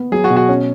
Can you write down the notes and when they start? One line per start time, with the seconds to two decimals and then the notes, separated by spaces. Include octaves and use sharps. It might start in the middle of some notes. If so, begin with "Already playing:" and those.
Already playing: B3
0.12 F#3 G#4
0.24 F#4
0.30 B2
0.36 F#4
0.49 C#4